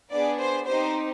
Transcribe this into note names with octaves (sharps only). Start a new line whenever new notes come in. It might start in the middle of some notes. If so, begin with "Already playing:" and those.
B3 D4 G#4 D5
C5
C4 D#4 G4 C5